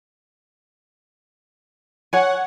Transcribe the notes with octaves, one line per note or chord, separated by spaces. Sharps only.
C#5 F#5 G#5